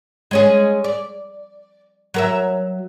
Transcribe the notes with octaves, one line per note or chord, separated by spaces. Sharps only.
G#3 C#4 G#4
D5
F#3 A#4 E5